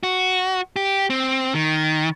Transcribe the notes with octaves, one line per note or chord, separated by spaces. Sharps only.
F#4
G4
C4
D#3